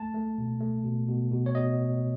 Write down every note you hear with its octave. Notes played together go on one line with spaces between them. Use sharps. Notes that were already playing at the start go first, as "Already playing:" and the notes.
Already playing: A3 A5
A3
B2
A3
B2
B2
B2
C#5
B2 D#5